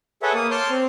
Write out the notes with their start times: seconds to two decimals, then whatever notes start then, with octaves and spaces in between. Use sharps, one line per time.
0.23 G#4 A4 B4 C#5 E5 F#5
0.34 A#3 D#6
0.51 C#5 A5 C6 D6 F6 G6
0.70 C4